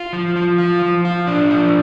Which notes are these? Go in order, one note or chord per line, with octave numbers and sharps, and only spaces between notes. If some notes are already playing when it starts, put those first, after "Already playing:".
Already playing: F4
F3
F3
F4
F3
F4
D4
F3